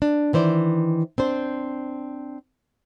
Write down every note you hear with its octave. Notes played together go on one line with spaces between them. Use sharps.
D4
D#3 E3 C5 D5
C4 D4 C5